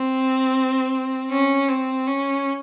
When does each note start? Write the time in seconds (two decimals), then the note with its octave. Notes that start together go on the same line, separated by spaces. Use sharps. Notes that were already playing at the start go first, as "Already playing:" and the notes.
Already playing: C4
1.31 C#4
1.69 C4
2.07 C#4